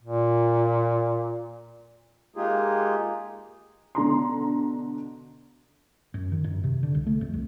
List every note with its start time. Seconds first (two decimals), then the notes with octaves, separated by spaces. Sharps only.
0.02 A#2
2.36 G#3 A#3 D#4 F4 G4 G#4
3.95 B2 D3 A#5 C6
6.14 F#2
6.32 D#3
6.44 F#2
6.64 C3
6.83 D3
6.95 C2
7.06 A3
7.21 F2
7.33 C2